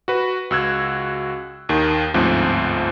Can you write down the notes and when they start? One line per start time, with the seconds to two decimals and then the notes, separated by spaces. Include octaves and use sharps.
0.08 F#4 B4
0.51 C#2 F#4 E6 F#6 G#6
1.69 D#2 D#3
2.14 G1 D2 G#2 F3 C4